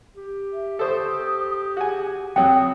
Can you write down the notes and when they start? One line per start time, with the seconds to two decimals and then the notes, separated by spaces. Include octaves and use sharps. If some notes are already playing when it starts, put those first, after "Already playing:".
0.16 G4
0.53 E5
0.79 A4 C5 C#6 D#6
1.77 F#4 G#4 G#5
2.36 F2 F#3 C#5 G5 D#6